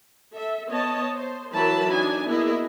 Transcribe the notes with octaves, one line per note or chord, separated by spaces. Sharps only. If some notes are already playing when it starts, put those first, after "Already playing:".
A4 E5
B3 C#5 D#5 A5
C5
E3 F#3 E4 A#4 A5 B5
D4 D#4 G#5
A#3 B3 E4 G#4 D#5